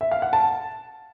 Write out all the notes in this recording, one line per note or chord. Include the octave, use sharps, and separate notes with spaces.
E5
F5
F#5
A5